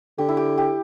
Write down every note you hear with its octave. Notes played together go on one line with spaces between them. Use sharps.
D3 G4
E4
G4
G4